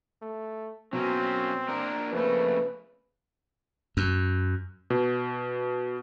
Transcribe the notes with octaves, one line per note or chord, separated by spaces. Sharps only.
A3
B2 F#3 A#3 C4 C#4 F#4
A#3 D4 A#4
F2 C#3 A3 A#3 B4 C5
F#2
B2